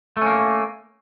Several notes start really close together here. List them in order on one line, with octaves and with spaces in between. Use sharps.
A3 C#4 A#3